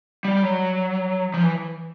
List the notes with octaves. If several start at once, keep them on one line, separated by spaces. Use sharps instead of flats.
G3
F#3
F3
E3